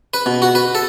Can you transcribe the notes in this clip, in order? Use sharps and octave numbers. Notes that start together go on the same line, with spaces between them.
B4
B2
F#4
B4
A4